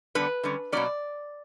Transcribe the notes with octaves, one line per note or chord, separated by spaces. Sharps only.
D3 G3 B3 D4 B4
D3 G3 C#4
B2 F#3 A#3 C#4 D5